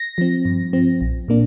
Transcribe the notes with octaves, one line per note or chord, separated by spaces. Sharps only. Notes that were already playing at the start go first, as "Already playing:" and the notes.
Already playing: A#6
F3 C4
G2
F3 C4
A#1
A#2 A#3 D4